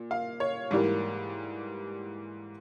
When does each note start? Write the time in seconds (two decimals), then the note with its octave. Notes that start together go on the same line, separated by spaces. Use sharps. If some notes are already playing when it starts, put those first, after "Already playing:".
Already playing: A#2
0.11 F5
0.40 C#5
0.71 G#2 E3 G3 A#3